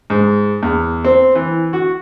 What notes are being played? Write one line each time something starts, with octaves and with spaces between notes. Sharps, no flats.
G#2
E2
C4
E3
F#4